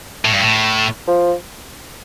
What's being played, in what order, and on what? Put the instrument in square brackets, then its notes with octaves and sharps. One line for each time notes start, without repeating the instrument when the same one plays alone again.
[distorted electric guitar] A2
G2
A2
[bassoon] F3